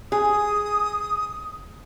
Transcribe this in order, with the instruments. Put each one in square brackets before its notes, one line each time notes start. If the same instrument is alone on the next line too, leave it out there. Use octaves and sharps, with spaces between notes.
[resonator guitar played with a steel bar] G#4 [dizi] D#6